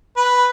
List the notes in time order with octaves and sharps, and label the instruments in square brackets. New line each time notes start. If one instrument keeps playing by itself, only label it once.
[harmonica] B4